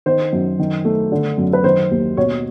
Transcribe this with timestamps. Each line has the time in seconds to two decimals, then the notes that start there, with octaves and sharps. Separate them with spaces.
0.06 D#3 C5
0.33 F#2
0.59 D#3
0.85 A3
1.12 D3
1.38 F#2
1.53 B4
1.64 D#3 C5
1.91 D#2
2.17 B2 C#5